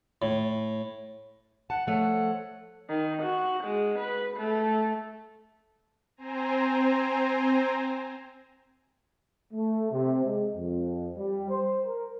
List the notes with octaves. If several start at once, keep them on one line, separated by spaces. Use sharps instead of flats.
A2
F#5 A5
F3 A3 C#5 F#5
D#3
F#4
G#3
B4
A3
C4 C5 G#5 A#5
A3
C3
G#3
F2
G3
C5
A#4